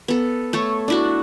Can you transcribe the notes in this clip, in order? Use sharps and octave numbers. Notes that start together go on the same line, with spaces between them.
B3 A4
A3 A4 C#5
D4 E4 F#4